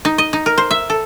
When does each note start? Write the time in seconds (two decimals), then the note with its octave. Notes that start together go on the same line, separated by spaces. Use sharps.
0.05 D#4
0.18 D#5
0.33 D#4
0.46 A#4
0.58 C5
0.71 E5
0.90 A4